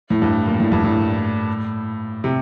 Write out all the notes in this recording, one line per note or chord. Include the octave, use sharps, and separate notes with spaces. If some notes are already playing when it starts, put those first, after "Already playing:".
A2
G2
A#2
A2
G2
A2
C3